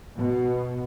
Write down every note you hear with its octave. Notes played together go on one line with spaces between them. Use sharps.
B2